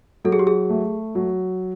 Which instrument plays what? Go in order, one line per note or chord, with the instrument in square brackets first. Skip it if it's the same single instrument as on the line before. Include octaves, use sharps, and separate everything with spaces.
[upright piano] F#3 [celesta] A4
[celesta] G#4
G4
G#4
[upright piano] A3
F#3